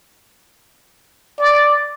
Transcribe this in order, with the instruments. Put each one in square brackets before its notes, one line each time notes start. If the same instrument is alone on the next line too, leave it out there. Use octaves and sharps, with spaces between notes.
[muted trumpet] D5